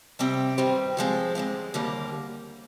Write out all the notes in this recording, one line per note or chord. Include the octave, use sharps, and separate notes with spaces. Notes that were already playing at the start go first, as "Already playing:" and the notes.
C3 G3 C4 G5
G2 D#3 G3 C4
G2 F3 G#3 C4
F2 D3 G#3 C4
D#2 D3 G3 A#3